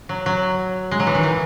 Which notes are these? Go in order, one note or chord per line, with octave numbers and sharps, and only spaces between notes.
F#3
F#3
G#3
F#3
E3
D#3
E3